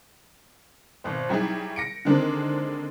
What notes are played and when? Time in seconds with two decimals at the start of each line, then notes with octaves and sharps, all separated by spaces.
1.04 G#1 B2 C5
1.29 F#3 G3 D#4 E4 G#4
1.76 A#6 C#7 D7
2.05 D3 D#3 G#3 C4 D4 A#4